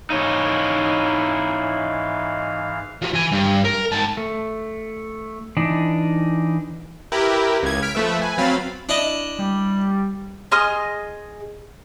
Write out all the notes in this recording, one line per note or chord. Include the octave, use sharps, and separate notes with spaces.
G#2 E3 D#4 E4 C#5 F5
F3 F#3
E3 G#5
G2
A#4
G#2 A5
A3
E3 D4 D#4
E4 G4 A#4 B4
C#2 G#6
F6 B6 D7
F3 A3 B4 E5
B4 G#5
F#3 C4 F5 B5 A6
D4 E4 D#5
G3
G#4 D#5 C6 F6